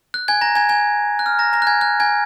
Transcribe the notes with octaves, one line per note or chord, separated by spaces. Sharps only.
F#6
G#5 G#6
A#5 A#6
G#5 G#6
G#5 G#6
F#6
F6
A#5 A#6
A#5 A#6
F#6
G#5 G#6
F#6
G#5 G#6